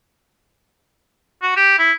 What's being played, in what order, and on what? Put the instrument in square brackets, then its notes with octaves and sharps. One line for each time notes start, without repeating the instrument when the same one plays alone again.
[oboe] F#4
G4
E4